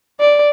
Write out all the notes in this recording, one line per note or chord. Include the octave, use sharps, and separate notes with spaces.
D5